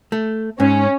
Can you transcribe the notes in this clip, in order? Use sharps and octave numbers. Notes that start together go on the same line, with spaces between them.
A3
G#2 C#4